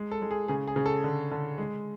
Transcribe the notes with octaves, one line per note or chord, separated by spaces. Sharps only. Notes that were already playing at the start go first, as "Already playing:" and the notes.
Already playing: G#3
A4
G#3
G#4
C#3 G#4
G#4
C#3
A4
D3
D3
G#3